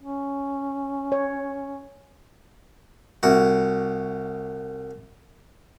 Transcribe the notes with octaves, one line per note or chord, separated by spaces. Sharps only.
C#4
C#5
C2 F#4